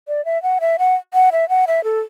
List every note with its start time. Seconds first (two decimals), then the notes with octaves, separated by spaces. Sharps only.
0.08 D5
0.25 E5
0.43 F#5
0.61 E5
0.79 F#5
1.14 F#5
1.32 E5
1.49 F#5
1.67 E5
1.84 A4